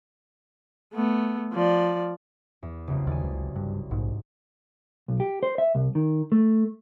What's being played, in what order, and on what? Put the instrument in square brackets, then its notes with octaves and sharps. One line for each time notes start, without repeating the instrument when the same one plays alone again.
[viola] A3 B3
F3 D5
[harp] E2
F#1 C2
[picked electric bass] D#2 [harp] D5 G#5
[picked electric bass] C#2
G2
[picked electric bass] A#1 [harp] G#2
[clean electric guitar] B1
G4
C5
E5
C2
D#3
A3